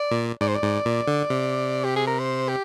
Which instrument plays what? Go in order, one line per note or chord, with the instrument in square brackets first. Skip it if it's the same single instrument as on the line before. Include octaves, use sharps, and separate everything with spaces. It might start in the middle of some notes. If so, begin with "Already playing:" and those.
Already playing: [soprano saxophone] D5
[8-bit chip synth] A#2
[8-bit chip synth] G#2 [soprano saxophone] D5
[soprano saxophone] C5
D5
[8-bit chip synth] G#2
A#2
D3
C3
[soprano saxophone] G4
G#4
A#4
C5
G4